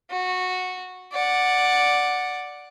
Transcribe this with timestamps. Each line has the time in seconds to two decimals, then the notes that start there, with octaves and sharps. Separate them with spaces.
0.10 F#4
1.12 D5 F#5